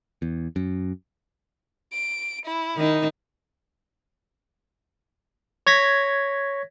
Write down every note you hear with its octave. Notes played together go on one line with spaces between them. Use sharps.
E2
F#2
D7
E4
D#3 D#4
C#5 G#6 A#6 B6